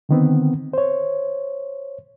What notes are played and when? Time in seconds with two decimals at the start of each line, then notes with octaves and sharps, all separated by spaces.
0.09 D3 D#3 B3 C4
0.73 C5 C#5